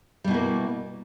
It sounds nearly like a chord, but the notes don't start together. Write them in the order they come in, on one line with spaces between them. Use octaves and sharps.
G3 B2 E4 A#3